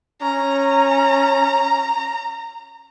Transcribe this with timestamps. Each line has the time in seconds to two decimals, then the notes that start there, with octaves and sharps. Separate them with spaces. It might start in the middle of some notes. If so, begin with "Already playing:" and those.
0.22 C#4 A#5